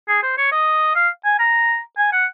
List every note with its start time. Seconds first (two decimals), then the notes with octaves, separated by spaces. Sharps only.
0.09 G#4
0.23 C5
0.38 C#5
0.52 D#5
0.96 F5
1.25 G#5
1.39 A#5
1.98 G#5
2.13 F#5